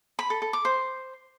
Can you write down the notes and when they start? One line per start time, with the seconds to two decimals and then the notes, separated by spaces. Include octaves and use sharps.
0.19 B5
0.30 A4
0.42 A4
0.53 D6
0.65 C5